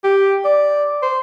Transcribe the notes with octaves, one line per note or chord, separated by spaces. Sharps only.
G4
D5
C5